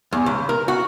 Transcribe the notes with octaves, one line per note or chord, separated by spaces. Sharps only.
E2
C#2
A#4
F#4